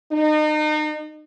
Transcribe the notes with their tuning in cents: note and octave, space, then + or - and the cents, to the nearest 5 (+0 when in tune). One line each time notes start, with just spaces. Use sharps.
D#4 -35